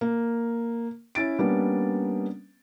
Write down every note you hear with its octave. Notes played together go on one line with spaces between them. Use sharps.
A#3
C#4 E4 A6 D7
G3 A#3 B3 C#4 D4